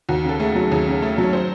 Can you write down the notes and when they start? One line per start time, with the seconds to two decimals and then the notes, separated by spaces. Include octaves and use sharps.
0.09 D#2 F#4
0.24 C#3 A4
0.40 A3 G#4
0.56 F#3
0.71 D#2 G#4
0.87 C#3
1.02 A3 A4
1.18 F#3
1.23 C#5
1.33 C5